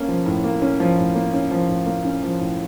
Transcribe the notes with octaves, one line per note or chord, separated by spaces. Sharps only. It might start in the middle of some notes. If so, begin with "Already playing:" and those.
Already playing: A#3 C#4
F3
A2
A#3
C#4
F3
A2
A#3
C#4
F3
A2
A#3
C#4
F3
A2